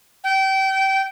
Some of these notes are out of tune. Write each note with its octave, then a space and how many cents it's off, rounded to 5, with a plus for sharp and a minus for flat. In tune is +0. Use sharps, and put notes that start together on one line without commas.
G5 -25